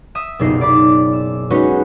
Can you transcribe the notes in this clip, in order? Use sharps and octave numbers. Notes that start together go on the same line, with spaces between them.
E5 D#6 E6
F#1 C2 B2 D#4 F4 C7
D5 B5 D6
E6
G#3 C#4 D#4 F#4 B4 C#5